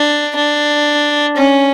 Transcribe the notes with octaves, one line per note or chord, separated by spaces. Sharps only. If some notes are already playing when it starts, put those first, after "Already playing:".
Already playing: D4
D4
C#4